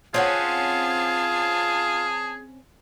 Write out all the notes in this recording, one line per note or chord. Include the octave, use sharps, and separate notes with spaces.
C4 C#4 F4 G#4 F#5 A5